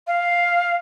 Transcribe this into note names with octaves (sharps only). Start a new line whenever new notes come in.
F5